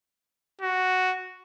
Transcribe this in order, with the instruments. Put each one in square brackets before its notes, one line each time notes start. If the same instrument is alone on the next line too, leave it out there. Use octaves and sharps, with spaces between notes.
[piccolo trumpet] F#4